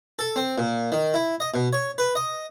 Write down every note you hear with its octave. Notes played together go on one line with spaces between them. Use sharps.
A4
C4
A#2
D#3
E4
D#5
B2
C#5
B4
D#5